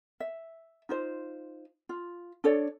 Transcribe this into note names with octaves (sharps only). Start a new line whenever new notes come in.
E5
D#4 F4 C5
F4
D4 A4 C#5 D5